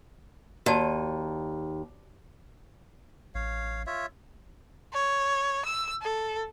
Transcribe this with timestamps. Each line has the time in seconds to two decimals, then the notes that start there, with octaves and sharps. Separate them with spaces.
0.66 D#2 F#4 D5 A5
3.35 A1 C#5 F5
3.87 F4 C#5 E5
4.94 C#5
5.65 E6
6.02 A4